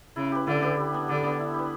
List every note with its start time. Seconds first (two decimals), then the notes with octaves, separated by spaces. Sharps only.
0.16 C#3 E4
0.32 G4 B4
0.47 D3 E4
0.62 G4 B4
0.77 G3
0.92 B3 D4
1.08 D3 G3
1.24 B3 D4
1.39 E4
1.54 G4 B4